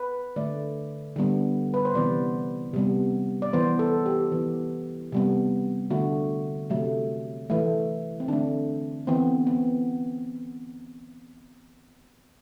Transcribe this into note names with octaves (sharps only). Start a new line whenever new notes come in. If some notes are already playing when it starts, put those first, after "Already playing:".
Already playing: B4
D3 A3 D5
D3 G3 B3
B4
C5
C3 E3 B3 D5
C3 G3 B3
D5
E3 B3 C5
A4
G4
E3 B3
C3 G3 B3
D3 A3 F#4
C3 F#3 A3
E3 A3
C4
D3 A3 D4
E3 B3 C4
B3